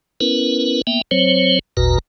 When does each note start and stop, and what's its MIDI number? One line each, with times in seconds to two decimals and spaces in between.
0.21 0.82 59
0.21 0.82 61
0.21 0.82 64
0.21 0.82 70
0.21 0.82 71
0.87 1.02 58
0.87 1.02 59
0.87 1.02 76
0.87 1.02 79
1.11 1.59 54
1.11 1.59 60
1.11 1.59 72
1.11 1.59 73
1.77 1.99 32
1.77 1.99 39
1.77 1.99 46
1.77 1.99 66
1.77 1.99 71
1.77 1.99 82